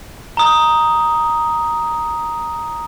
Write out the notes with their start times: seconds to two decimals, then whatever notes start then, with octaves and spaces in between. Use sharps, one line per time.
0.37 A#5 D#6